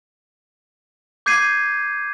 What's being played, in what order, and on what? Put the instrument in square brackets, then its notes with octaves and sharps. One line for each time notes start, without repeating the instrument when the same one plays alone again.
[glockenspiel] D6 G6 G#6 C7 D#7